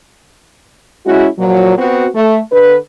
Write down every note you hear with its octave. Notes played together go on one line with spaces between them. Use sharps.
G#3 C#4 E4 F#4
A#2 F3 F#3
B3 C4 F#4
A3
D3 B4